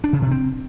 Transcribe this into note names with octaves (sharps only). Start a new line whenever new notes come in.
D4
C#3
C3
C4